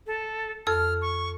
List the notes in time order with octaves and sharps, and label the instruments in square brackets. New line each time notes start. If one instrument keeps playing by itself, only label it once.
[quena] A4
[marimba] F2 A4 E6 [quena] F6
[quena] C#6